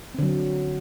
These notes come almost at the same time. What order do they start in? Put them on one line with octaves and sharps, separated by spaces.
C4 D3 F#3